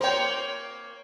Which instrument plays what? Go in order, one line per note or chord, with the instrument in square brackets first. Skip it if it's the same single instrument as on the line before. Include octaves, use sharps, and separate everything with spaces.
[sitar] A#3 C#5 [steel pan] C5 G5